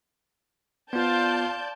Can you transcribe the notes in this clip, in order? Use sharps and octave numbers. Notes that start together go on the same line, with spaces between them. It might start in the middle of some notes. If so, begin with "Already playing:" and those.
B3 F4 C5 D5 F5 A5 G6